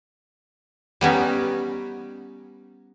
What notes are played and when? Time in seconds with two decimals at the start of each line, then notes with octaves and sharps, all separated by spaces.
1.01 G3 B3 C#4 D#4